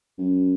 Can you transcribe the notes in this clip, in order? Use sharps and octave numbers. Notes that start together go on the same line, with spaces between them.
F#2